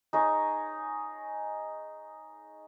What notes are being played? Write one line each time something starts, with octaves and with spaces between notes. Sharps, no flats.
D#4 G#4 C#5